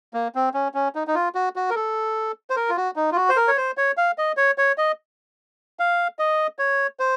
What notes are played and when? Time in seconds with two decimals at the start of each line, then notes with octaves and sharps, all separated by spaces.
0.14 A#3
0.35 C4
0.54 C#4
0.74 C#4
0.95 D#4
1.07 D#4
1.15 F4
1.35 F#4
1.56 F#4
1.70 A#4
1.75 A4
2.50 C5
2.56 A#4
2.70 F4
2.77 F#4
2.96 D#4
3.12 F4
3.16 F#4
3.29 C5
3.36 A#4
3.48 C#5
3.57 C5
3.77 C#5
3.97 F5
4.18 D#5
4.37 C#5
4.58 C#5
4.78 D#5
5.79 F5
6.19 D#5
6.59 C#5
7.00 C5